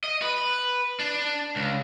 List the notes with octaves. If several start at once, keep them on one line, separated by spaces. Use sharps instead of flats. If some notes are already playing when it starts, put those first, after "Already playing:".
D#5
B4
D4
C#2